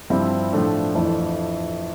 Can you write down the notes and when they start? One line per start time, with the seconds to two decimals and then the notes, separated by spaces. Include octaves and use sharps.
0.10 G2 F3 C4 E4
0.52 A2 F3 A3 D4
0.95 F2 E3 A3 E4